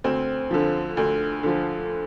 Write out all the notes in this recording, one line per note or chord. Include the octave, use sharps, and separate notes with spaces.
D2 C4
D3 F3
D2
D3 F3